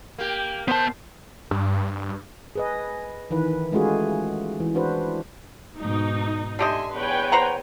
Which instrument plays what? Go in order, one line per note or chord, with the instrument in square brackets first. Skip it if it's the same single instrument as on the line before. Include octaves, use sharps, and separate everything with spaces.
[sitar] A#3 G4
[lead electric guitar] B3 A5 [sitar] C5
[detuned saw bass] G2
[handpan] G#4 B4 D#5
D#3 E3 B4
G#3 A3 C#4 F4 F#4 G#4
E3
D4 F#4 B4 C5
[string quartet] G#2 B2 [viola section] D#4
[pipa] D3 G4 D#5 [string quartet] E5 G#5 C6
[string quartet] E2 C#5 [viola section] B4 G5 G#5
[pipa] C5 F#5 A#5